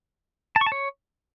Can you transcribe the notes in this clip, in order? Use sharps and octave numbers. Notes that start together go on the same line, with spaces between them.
A5
C#6
A5
C#5